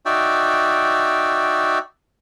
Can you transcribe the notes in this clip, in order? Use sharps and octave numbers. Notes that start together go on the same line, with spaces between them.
D#4 F#4 D5 E5 G5